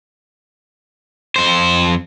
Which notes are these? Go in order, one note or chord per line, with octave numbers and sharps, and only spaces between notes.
F2 C5